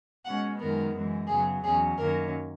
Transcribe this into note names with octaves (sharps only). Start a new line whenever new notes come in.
B2 G#3 C#4 F#5
F#2 D#3 G#3 B3 A#4
F#2 E3 G#3
F#2 C#3 F#3 B3 G#4
E2 B2 F#3 C#4 G#4
F#2 D#3 A#3 C#4 A#4